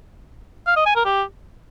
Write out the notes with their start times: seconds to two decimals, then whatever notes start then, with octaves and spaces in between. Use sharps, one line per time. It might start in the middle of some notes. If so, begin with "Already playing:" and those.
0.67 F5
0.76 D#5
0.86 G#5
0.95 A#4
1.05 G4